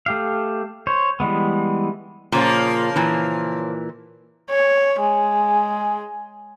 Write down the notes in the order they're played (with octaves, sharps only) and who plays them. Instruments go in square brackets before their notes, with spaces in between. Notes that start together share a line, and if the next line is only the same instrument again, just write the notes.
[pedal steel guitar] A3 G4 F5
C5 C#5
E3 G3 G#3 B3
[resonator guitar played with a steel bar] A#2 [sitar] C#3 F3 A#3
[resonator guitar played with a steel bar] A#2 E3
[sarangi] C#5
G#3